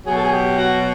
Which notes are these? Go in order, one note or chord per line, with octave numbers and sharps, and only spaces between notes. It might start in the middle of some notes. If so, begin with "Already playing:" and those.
B2 F#3 G#4
A4
G#4
G4
F#4